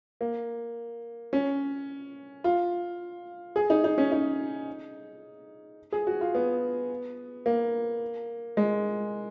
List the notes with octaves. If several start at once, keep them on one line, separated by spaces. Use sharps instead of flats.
A#3
C#4
F4
G#4
D#4
D#4
C#4
D#4
G#4
F#4
F4
B3
A#3
G#3